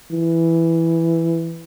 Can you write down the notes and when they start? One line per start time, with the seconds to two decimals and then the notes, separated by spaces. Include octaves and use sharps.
0.11 E3